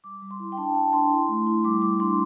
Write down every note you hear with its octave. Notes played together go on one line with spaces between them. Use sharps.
G3 D6
G3
C6
E4
G5
D4 A5
D4 A5
D4 C6
E4
A3
E4
G3 D6
G3 D6
D4 C6